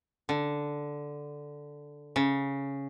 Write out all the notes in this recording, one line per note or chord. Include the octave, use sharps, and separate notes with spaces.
D3
C#3